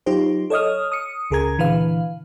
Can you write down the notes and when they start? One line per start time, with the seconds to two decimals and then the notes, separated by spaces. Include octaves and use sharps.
0.06 F#3 D#4 F4 G4 C5
0.50 A4 C#5 D#5 D#6 F6
0.92 D#6 C#7
1.31 C#2 C#3 G#4 A#4 A#5 G#6
1.58 A#2 D3 E3 B4 F5